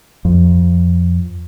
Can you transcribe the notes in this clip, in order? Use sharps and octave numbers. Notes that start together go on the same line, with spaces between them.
F2